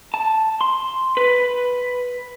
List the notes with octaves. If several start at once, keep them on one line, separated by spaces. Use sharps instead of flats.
A5
C6
B4